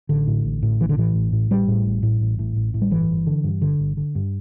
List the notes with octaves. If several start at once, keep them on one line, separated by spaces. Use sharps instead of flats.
A1 D3
A2
A1
A2
A1 E3
D3
A2 E3
A1
A2
A1 G3
A2
A1
A2
A1
A2
A1
A2
G3
G1 E3
G1
D3
G2
G1 D3
G1
D3
G2